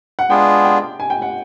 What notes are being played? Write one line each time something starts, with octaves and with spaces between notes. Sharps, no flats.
F#5
G#3 B3 D4 F4 G#4 G5
G5
G#5
G5
F#5